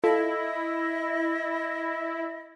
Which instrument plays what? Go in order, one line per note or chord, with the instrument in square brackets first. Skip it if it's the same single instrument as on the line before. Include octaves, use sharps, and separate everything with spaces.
[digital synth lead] E4 [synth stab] F4 A4 [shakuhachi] D#5